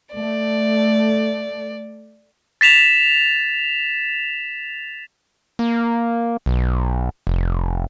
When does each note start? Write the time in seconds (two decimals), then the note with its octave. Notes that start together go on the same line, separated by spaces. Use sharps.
0.15 A3 D5
2.61 A6 B6 E7 F7
5.59 A#3
6.46 B1
7.27 F1